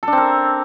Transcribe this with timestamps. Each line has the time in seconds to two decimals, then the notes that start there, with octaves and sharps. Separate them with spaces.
0.03 A4
0.08 D4
0.13 C4
0.17 A#4